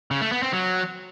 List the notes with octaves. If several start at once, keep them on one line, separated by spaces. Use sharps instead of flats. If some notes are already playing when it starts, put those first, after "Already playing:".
C#3
A3
B3
C4
F#3